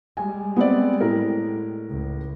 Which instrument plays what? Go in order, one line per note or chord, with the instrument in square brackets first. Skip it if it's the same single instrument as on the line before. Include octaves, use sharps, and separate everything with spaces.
[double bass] G3 G#3 [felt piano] G#5
[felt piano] B3 C4 D5
A2 A#4
[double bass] C#2